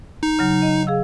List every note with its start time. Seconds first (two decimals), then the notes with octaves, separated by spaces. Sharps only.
0.23 D#4
0.39 C#3 F#3
0.62 D#5
0.87 G#4 F5 E6